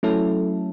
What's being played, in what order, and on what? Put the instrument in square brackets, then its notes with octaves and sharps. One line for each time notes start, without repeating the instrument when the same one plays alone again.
[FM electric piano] F#3 A3 C#4 E4 A4